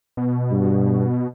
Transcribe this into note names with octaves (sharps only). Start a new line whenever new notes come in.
B2
G2